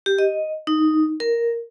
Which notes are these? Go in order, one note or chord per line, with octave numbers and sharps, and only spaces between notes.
G4
D#5
D#4
A#4